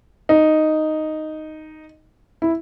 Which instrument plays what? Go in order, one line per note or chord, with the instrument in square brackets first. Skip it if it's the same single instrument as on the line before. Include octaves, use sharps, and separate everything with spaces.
[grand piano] D#4
E4